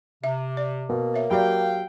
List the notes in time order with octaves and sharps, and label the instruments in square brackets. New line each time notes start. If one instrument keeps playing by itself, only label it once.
[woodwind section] C3 [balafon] E5
[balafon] D5
[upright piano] B2 [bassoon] A#3
[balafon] C#5 E5
[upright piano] F#3 G4 [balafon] D5 B5 [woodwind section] F5 G5